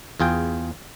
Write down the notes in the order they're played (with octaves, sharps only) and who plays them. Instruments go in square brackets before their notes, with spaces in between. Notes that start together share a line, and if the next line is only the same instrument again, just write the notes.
[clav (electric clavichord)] E2 F4 G#4 G5